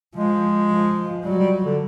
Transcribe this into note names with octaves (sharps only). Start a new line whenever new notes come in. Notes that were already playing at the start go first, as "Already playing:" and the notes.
F3 G#3
F3
F#3 G3
G3
D3